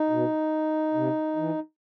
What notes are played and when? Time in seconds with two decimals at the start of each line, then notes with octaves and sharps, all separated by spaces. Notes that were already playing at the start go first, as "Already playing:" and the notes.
Already playing: D#4
0.10 B2
0.94 C3
1.36 E3